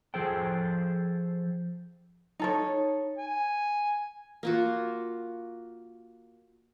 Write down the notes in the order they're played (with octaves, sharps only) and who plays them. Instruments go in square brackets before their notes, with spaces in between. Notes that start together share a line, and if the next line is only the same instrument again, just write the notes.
[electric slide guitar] F3 G#4 A4 C5 G5
[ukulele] D#4 A4 C#5
[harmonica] G#5
[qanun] A#3 F4 F#4